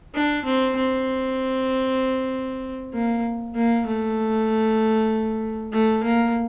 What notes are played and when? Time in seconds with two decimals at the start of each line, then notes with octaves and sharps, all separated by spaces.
0.14 D4
0.45 C4
0.76 C4
2.93 A#3
3.55 A#3
3.86 A3
5.72 A3
6.03 A#3